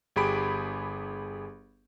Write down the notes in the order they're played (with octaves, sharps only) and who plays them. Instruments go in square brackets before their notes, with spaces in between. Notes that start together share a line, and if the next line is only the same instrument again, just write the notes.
[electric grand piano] G1 G4 G#4 B5 D7